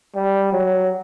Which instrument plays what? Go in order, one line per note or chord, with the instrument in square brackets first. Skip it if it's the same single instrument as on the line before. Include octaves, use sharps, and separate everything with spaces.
[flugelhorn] G3
F#3